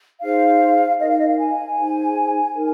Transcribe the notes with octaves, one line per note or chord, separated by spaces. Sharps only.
D#4 G#4 C5 F5
D#4 A#4 D#5
F5
D#5
F5
G#5
D#4 G#4 C5
D#4 A#4